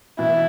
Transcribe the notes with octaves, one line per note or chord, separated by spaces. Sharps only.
B2 E3 E4